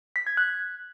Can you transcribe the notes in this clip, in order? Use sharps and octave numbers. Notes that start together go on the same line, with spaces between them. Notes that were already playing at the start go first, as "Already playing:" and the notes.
B6
G#6
F#6